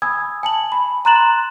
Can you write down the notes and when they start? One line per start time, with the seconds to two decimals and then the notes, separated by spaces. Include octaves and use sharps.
0.02 G#5 B5 D#6 E6 G#6
0.43 G#5 A5 F#7
0.72 B5
1.05 A#5 C6 F#6 A6 E7 F#7